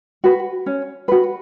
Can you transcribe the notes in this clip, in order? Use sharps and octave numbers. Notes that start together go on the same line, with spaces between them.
F#4 B4
C#4
F#4 B4